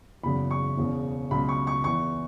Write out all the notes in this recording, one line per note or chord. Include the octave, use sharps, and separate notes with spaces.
F#1 E2 C#3 F#3 B5
C#6
E1 E2 C#3
C#2 B2 F#3 B5
C#6
C#6
E2 E3 C#6